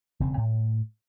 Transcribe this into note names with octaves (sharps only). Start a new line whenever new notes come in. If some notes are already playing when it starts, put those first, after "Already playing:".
E1 C#3 C4
A2